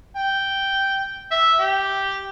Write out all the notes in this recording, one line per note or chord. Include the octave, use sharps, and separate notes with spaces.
G5
E5
G4